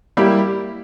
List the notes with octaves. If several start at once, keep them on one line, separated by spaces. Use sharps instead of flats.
G3 A#3 E4 G4